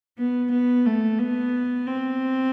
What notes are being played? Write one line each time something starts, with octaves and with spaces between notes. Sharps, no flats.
B3
B3
A3
B3
C4